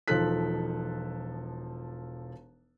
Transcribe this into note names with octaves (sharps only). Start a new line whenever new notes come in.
E1 F3 D#4 A4 F#6 B6